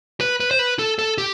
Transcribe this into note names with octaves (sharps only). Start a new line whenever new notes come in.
B4
B4
C5
B4
A4
A4
G4